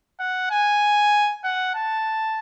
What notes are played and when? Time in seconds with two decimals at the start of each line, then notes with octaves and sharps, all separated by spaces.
0.20 F#5
0.51 G#5
1.44 F#5
1.75 A5